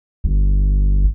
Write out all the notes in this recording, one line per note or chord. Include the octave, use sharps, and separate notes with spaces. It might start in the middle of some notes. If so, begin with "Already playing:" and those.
G1